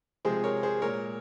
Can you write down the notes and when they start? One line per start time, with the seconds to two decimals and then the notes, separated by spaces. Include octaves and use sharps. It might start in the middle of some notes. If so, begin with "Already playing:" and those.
0.25 C3 F3 G#3 G#4 C5
0.44 A#4 C#5
0.63 G#4 C5
0.82 A#2 G#3 A#4 C#5